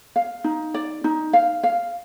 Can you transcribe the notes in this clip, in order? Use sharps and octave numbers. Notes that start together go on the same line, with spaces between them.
F5
D#4
D5
D#4
F5
F5